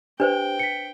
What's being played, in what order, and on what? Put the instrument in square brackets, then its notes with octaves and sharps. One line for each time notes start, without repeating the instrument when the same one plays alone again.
[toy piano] D4 B4 C5 [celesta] G4 [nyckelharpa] G5
[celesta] B6 C#7